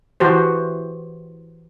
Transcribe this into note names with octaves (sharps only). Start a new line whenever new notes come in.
E3 F#4 G4 C5